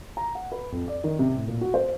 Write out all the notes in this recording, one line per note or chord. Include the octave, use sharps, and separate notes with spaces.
A#5
F#5
B4
F2
D5
D#3
C3
A2
A#2
F#4
C5